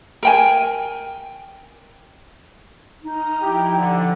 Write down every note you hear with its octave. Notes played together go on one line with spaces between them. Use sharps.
A#4 G5 G#5
D#4 D#5 F6
F3 E4 G4
D3